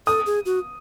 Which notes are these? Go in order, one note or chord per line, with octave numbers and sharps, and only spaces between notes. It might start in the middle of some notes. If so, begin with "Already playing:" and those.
A4 D#6
G#4
F#4